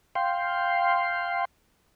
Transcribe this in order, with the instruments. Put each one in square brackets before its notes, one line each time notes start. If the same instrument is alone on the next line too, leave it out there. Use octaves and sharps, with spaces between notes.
[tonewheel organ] F5 G5 C6